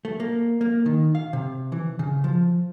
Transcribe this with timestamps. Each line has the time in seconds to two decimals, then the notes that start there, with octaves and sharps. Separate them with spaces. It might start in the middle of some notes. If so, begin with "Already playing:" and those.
0.05 A3
0.20 A#3
0.61 A#3
0.86 D#3
1.15 F5
1.33 C3
1.72 E3
1.99 C#3
2.24 F3